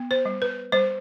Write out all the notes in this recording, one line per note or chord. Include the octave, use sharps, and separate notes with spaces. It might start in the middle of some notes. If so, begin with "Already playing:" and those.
Already playing: B3
C5
G3
B4
G3 C5